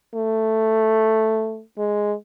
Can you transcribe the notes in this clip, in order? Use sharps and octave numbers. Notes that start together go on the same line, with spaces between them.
A3
G#3